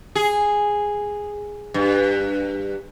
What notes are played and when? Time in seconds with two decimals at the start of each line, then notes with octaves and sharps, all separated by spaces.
0.15 G#4
1.74 G2